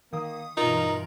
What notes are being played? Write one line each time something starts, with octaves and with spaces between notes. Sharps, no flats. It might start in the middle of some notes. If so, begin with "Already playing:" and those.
D#3 A#3 D#6
G2 B2 E3 D#4 F4 A#4 F7 F#7